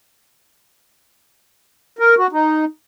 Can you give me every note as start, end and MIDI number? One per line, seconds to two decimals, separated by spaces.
1.99 2.15 70
2.18 2.27 66
2.33 2.65 63